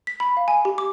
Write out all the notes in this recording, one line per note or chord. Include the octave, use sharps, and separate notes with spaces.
B6
B5
F5
G#5
G4
D6